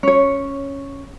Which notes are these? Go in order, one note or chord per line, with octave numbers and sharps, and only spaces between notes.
C#4 C#5